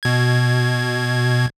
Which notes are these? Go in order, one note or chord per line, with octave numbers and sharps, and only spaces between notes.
B2 G#6